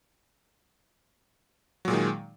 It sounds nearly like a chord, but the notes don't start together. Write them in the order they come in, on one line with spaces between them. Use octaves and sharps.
F#3 A#2 G#3 D#3